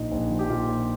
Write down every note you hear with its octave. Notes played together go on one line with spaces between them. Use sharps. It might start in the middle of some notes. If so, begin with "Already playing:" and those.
Already playing: A#1 A#2 D#4
A#1
F3
G4
A#2 F4
A#1